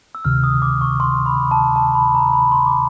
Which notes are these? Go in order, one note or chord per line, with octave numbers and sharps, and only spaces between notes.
E6
D2 C3 D#3 F6
D#6
D6
C#6
C6
B5
A5
A5
B5
A#5
B5
C6
D6